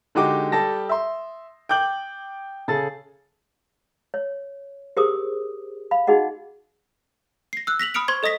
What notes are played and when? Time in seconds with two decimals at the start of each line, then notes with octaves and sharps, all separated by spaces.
0.15 D3 G#3 D#4 F#4 G4 D6
0.52 G3 G4 A4 A5 A#6
0.89 E5 C6
1.69 G5 D6 G6 F#7
2.68 C#3 G#4 A4 A6
4.14 C#5
4.97 G4 G#4 A#4 C5 D6 D#6
5.91 F5 B5
6.07 D#4 F#4 G#4 D#5 F#5
7.53 A#6 C7
7.67 E6 F#6
7.80 A#6 B6 F7 F#7
7.94 B5 D#6 F6 C#7 D7 F7
8.08 C5 C6 C#6 G#6
8.23 A4 D#5 D#6 A#6 B6